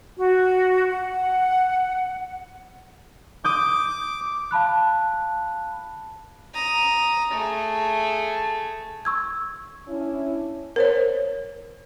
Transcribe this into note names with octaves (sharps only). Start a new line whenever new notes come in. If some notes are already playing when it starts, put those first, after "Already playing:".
F#4
F#5
D6 D#6 G6
F5 A5 B5 F#6
A#5 D#6
A3 G#4
C#6 E6 G#6
C#4 D4 E4
A#4 C5 C#5